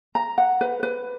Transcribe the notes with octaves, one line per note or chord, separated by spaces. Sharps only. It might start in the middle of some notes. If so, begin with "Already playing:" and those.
A#5
F#5
B4
B4